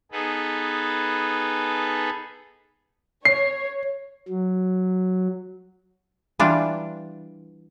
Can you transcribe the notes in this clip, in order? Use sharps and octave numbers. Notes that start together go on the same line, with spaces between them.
B3 D#4 G#4 A4 B4
C#5 C7
F#3
E3 G3 D4 F4 B4